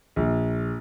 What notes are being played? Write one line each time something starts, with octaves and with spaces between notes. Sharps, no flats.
A#1